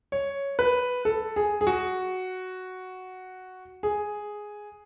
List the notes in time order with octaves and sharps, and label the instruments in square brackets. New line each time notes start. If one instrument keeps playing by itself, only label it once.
[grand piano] C#5
B4
A4
G#4
G#4
F#4
G#4